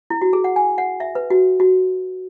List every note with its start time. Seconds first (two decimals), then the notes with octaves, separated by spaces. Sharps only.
0.10 E4
0.22 F#4
0.33 G#4
0.44 F#5
0.56 G#5
0.78 F#5
1.00 E5
1.15 B4
1.30 F#4
1.60 F#4